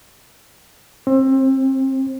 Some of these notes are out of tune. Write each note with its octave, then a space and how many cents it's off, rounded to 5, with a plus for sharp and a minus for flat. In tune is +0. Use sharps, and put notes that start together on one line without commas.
C4 +30